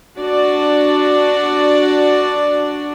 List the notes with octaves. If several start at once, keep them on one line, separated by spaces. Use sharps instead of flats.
D4 F#4 D5